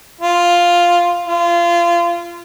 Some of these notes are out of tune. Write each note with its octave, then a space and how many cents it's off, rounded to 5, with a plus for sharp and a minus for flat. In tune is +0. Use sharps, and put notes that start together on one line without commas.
F4 +0
F4 -25